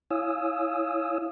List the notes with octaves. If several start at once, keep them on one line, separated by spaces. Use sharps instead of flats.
E4 C#5 F5 G#5 D#6 E6